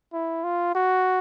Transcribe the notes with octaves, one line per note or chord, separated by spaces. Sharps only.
E4
F4
F#4